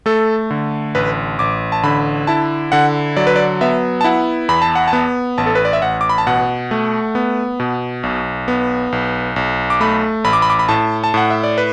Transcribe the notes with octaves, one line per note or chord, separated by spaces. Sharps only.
A3 A4
D3
A1 B4
A1 D6
A5
D3 B5
E4 A5
D3 F#5
F#3 D5
B4
D5
B3 E5
A5
E4 F#5
E2 B5
A5
F#5
A5
B3
A1 A5
A4
B4
D5
E5
A1 F#5
D6
B5
A5
B2 F#5
A3
B3
B2
B1
B3
B1
B1
D6
A3 B5
A1 B5
D6
B5
D6
B5
A2 A5
A5
A2 F#5
E5
D5
B4